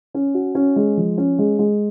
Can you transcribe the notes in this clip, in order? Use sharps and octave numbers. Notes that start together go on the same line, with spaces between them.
C#4
F#4
C#4
G#3
F3
C#4
G#3
G#3